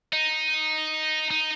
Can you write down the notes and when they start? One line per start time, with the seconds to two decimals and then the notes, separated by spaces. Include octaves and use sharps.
0.13 D#4
1.31 D#4